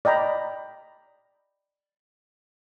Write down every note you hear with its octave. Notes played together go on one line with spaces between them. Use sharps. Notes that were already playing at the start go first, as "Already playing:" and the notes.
D5 D#5 G5 A#5 B5